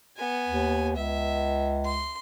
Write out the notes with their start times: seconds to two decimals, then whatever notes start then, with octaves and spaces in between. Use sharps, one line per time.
0.17 B3 G#5
0.48 D#2
0.96 C#2 E5
1.85 C6